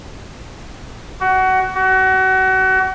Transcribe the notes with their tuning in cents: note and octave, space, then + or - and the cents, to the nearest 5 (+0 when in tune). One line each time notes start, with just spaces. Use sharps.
F#4 +20
F#4 +30